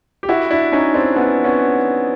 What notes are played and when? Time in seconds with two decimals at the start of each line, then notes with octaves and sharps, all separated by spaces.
0.23 G4
0.29 E4 F#4
0.51 D4 E4
0.72 C#4 D#4
0.94 C4 D4
1.16 B3 C#4
1.44 B3 C#4